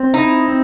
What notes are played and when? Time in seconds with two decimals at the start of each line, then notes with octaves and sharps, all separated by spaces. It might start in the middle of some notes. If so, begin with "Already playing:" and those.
Already playing: C4
0.14 D#4 E4
0.48 C4